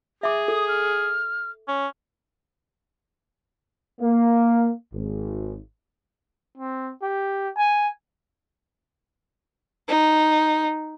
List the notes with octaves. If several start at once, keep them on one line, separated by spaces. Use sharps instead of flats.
G#4 E5 D6
A4 D#6
F6
C#4
A#3
G#1
C4
G4
G#5
D#4